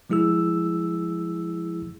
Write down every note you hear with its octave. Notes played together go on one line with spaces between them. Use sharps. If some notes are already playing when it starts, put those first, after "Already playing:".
F3 G#3 E4 G#4 E6